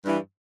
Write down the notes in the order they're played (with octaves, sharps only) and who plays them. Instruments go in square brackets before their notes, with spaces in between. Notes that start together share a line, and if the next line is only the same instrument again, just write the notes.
[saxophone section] G2 E3